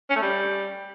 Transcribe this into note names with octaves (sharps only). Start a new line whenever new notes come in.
C#4
A3
G3